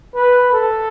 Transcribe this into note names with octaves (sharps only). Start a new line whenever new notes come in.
B4
A4